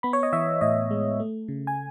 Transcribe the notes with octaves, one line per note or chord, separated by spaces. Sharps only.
B3 B5
C#5
D#5
E3 E5
A2 D#5
G#3
A3
C#3
G#5